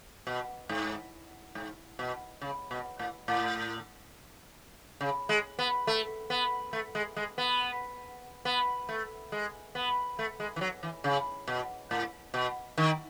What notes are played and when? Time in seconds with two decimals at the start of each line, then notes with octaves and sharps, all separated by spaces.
0.27 B2
0.69 G#2
1.55 G#2
1.99 B2
2.41 C#3
2.71 B2
2.99 A2
3.28 A2
5.01 C#3
5.29 G#3
5.59 B3
5.87 A3
6.30 B3
6.73 A3
6.95 G#3
7.16 G#3
7.38 B3
8.45 B3
8.89 A3
9.32 G#3
9.75 B3
10.19 A3
10.40 G#3
10.56 E3
10.61 F#3
10.83 E3
11.04 C#3
11.48 B2
11.91 A2
12.34 B2
12.78 D#3